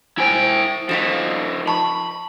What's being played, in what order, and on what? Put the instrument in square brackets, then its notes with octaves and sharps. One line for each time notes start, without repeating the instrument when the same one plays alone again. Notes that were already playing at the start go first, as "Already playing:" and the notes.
[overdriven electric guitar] E4 G5 [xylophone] C5 G#5
[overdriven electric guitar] F3 D#4 [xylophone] B6 C#7 E7
[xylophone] A5 C#6 [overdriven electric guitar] B5